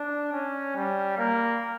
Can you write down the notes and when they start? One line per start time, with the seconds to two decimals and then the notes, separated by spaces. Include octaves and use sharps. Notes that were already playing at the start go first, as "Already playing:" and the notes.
Already playing: D4
0.33 C#4
0.76 G3
1.18 A#3